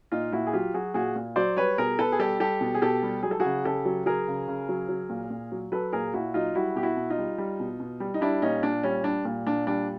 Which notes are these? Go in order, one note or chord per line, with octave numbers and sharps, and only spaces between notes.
A#2 D#4 F4
A#2 E4 F#4
G#4
F#3 F4 G4
F#3 F#4 G#4
A#2 F#4 G#4
A#2
F#3 C5 D5
G3 B4 C#5
B2 G#4 A#4
B2 A4 B4
G#4
G3 G4 A4
G3 G4 A4
B2
G#4
B2 G4 A4
G3
F#3 G#4
A4
C#3 F#4 G#4
C#3 G4 A4
F#3
F#3 G#4 A#4
C#3
C#3
F#3
F#3
A#2
A#2
F#3
F#3 A4 B4
A#2 G#4 A#4
A#2 E4 F#4
F#3 D#4 F4
G3 E4 F#4
B2 G4
E4 F#4
B2
D#4 F4
G3
G3
B2
B2
G3
D#4
G3 D4 E4
A#2 C#4 D#4
A#2 D4
G3 C#4
G3 D4
A#2
A#2 D4
G3 D4